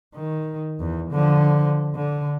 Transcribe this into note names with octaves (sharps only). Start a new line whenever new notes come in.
D#3
E2
D3 F3
D3